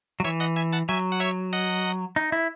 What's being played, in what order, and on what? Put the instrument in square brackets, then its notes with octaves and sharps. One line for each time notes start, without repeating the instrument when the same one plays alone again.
[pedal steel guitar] F#3
[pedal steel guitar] E3 [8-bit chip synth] C#5 E5
[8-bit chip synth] D#5 F#5
E5 G#5
F#5 A5
[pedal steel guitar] F#3 [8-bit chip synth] E5 G#5
[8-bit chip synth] F#5
C#5 E5
D#5 F#5
[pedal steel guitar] D#4
E4